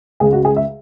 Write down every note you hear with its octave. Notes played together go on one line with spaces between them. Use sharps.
C#2 C#3 G#3 G#4
F#4
G#4
E5